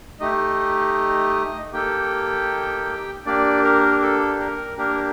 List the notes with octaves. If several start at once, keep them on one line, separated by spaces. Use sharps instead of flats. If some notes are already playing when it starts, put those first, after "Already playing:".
A3 D#4 G4 D#5
A#3 D#4 G4 A4 G5
A#3 D4 G4 D5
A#4
A4
A#4
A#3 D4 G4 A#4